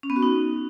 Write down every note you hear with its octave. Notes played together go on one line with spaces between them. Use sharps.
C#4
B3
F#4
D#4